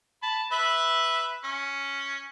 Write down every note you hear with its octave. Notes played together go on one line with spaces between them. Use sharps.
A5 B5
B4 E5 B5
C#4